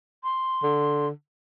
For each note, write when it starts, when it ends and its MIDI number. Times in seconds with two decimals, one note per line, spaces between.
0.24 1.08 84
0.63 1.10 50